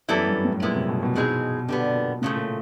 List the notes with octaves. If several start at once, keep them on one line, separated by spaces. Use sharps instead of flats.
F#2 E3 G3 B3 E4 A4
G2
A2
A#2 G#3 B3 E4
C3
B2
B2
E3 G#3 C4 D#4 G#4
B2 D3 G3 B3
A#2
A2 C#3 F3 A3
A#2